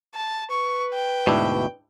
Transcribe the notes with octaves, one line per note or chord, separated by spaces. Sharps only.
A5
B4 C#6
G5
D2 G#2 B2 D4 E4